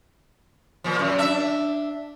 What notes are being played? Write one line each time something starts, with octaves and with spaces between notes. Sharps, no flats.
A#2 F3
F#2
D4 E5